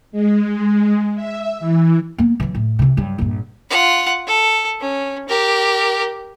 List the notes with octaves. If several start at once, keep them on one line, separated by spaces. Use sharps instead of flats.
G#3
E5
E3
A#3 B3
E3 F#3
A2
C3 E3
G2 F#3
A#1 G2
F4 F#5
A4
C#4
G4 A#4